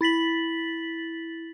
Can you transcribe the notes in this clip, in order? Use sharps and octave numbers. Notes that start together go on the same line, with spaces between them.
E4 A6 B6 F#7